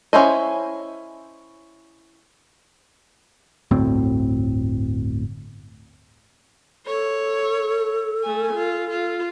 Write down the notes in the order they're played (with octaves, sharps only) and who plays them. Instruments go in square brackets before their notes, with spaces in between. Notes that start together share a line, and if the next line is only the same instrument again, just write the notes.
[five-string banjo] C#4 E4 C5 D#5
[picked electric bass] G1 D2 A2 C4
[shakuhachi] A4 [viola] C#5
[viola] A3 G#5
F4
F4